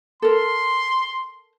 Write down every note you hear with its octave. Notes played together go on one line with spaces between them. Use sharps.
A4 A#4 C6